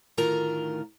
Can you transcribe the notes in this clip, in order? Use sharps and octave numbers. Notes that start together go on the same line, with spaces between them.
D2 A2 D#3 F4 A#4 A#5